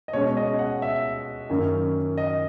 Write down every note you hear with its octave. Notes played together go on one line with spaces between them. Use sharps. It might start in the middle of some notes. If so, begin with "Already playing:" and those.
D#5
B2 G#3 C#4 C#5
D#5
F#5
E5
F#2 D#3 A#3 C#4
D#5